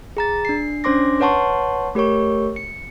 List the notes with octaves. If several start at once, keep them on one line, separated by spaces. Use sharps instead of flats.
G#4 A#5 A6
D4 C7
C#4 D4 C5 C6 D6 A#6
B4 C#5 F#5 A5 C6 C#6
A3 G4 A#4 C#5 C#6
C#7